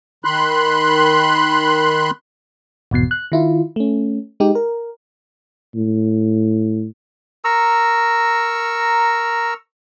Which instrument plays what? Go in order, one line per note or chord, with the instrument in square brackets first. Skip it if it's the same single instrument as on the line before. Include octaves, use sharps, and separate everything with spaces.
[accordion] D#3 B5 C6 F#6
[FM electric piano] G#1 E2 B2 C7
F#6
D#3 E4 F4
A3 C#4
G#3 D#4 G4
A#4
[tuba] A2
[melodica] A#4 A#5 C#6 E6